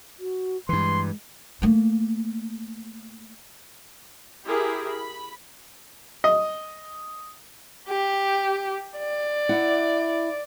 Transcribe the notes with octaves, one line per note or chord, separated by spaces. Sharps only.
F#4
G2 E3 G#3 C6
A3 A#3
E4 G4 G#4 A#4 B5
B5
D#5
G4
D5
E4 F#5